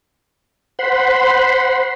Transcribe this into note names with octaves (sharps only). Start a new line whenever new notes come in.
C5 F#5 B5 C6